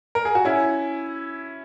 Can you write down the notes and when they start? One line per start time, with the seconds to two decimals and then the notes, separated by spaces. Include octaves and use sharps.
0.15 A#4
0.25 G#4
0.35 F#4
0.45 C#4 E4